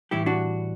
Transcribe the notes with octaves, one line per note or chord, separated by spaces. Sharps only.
A2 E3 G3 E4 G4
D4 F#4